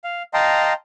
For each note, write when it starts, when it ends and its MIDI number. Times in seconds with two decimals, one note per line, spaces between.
0.04 0.23 77
0.34 0.73 75
0.34 0.73 77
0.34 0.73 79
0.34 0.73 81
0.34 0.73 82
0.34 0.73 84